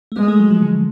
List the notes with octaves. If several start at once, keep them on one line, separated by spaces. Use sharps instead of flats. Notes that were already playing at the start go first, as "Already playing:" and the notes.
A3
G#3 B3
A3
F#3
F3
D3